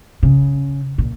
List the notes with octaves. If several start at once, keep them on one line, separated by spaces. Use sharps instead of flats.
C#3
A#2